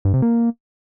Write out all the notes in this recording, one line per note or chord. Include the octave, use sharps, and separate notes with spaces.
G2
C3
A#3